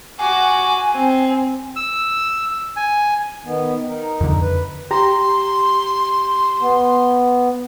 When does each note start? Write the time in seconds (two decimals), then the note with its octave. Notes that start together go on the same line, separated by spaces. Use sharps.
0.19 F#4 G#5 D6
0.93 C4
1.76 E6
2.76 G#5
3.45 D#3 B3
3.88 D#4 A#4
4.21 F2 D3
4.41 B4
4.91 G4 A#5 C6
6.62 B3